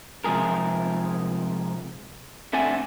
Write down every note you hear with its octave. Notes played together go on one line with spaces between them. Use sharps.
C3 F3 G#3 G#4 A#4
A3 C4 D4 D5 F#5 G#5